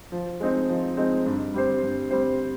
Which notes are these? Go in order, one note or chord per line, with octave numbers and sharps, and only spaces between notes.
F3
G#3 C4 D#4
F3
G#3 C4 D#4
G2
G3 C4 G4 C5
G2
G3 C4 G4 C5